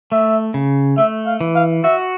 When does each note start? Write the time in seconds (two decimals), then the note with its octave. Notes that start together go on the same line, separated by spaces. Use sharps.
0.12 A3 E5
0.54 C#3
0.97 A3 E5
1.26 F5
1.41 E3
1.55 F5
1.83 F#4 E5